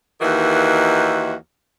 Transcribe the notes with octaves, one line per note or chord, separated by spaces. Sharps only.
D#2 D#3 E3 F#4